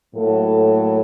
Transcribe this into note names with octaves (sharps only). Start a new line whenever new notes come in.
A2 F#3 A#3 A4